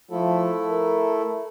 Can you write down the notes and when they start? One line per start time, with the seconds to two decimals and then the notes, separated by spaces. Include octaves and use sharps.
0.11 F3 A3 E4 A4
0.69 A#4